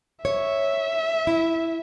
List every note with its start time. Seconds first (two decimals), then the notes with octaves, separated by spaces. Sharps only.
0.25 C#5 E5
1.27 E4